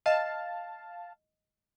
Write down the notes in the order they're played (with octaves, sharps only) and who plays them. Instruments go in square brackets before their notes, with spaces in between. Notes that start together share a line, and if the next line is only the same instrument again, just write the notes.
[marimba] D#5 [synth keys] F5 A5